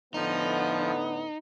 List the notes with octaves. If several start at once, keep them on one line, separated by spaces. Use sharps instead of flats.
A2 D3 F3 B3 D#4